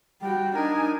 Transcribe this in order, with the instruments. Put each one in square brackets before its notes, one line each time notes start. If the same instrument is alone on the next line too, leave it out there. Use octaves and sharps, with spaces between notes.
[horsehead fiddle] G3 F#4 [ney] G5
[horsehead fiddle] D4 G#5 [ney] D#4 [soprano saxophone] A#4